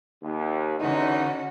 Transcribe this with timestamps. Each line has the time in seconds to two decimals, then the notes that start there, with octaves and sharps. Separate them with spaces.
0.23 D#2
0.79 E2 D3 C#4 D#4 F#4